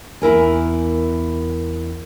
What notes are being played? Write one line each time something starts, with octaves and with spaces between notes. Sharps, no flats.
E2 E4 A#4 G#5